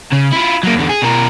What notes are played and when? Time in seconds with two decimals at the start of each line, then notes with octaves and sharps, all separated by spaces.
0.12 C#3
0.32 E4 F4
0.63 F#3 A#3
0.75 E2 D3
0.90 G#4
1.03 B2 A#4